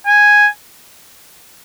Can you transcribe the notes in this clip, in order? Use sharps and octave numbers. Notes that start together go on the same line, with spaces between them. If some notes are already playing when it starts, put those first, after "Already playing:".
G#5